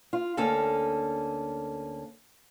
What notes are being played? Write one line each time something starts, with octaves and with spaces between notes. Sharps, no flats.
F4
D2 A#3 C#4 A4